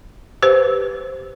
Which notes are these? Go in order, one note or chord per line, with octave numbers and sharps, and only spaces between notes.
G4 B4 C5